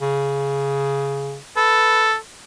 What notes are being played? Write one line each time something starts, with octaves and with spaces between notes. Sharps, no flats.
C#3
A4 B4